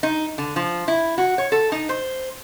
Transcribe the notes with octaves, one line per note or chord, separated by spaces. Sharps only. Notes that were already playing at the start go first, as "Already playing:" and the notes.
D#4
D3
F3
E4
F#4
C#5
A4
D#4
C5